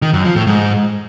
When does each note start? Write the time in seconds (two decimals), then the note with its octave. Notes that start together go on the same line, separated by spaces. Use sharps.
0.02 D#3
0.13 F#2
0.25 F3
0.36 A2
0.47 G#2